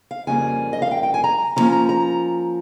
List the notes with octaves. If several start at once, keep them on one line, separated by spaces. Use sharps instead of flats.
F5
F2 C#3 G3 A#3 G#5
D#5
F5
G5
G5
G#5
A#5
C#3 F3 A#3 C#4 A#5
A#5
A#5